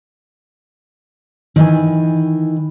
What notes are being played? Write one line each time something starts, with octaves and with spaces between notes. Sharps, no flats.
D#3 E3 G#5